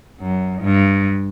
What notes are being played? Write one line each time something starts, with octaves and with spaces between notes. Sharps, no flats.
F#2
G2